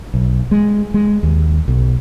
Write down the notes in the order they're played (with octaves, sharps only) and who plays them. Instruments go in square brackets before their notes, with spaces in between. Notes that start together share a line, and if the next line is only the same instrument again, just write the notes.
[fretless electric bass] B1
G#3
G#3
D#2
B1